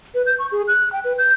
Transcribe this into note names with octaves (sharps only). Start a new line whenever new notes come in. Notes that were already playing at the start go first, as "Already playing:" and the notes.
B4
G6
C#6
G#4
F#6
G5
B4
G6